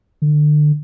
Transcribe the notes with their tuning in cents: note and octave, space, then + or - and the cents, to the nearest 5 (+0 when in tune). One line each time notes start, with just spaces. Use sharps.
D3 +30